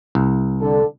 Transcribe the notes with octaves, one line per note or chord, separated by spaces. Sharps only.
C2
D3 A4